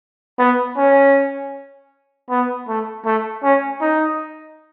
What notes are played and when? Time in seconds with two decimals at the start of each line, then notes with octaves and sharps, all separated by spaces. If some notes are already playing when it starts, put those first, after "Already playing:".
0.39 B3
0.77 C#4
2.30 B3
2.68 A3
3.05 A3
3.43 C#4
3.81 D#4